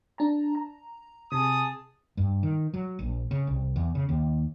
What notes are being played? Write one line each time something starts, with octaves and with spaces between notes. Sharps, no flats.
D4 A5 A#5
A#5
C3 G#4 A5 D#6
G2
D#3
F#3
A#1
C#3
C2
E2
C#3
D#2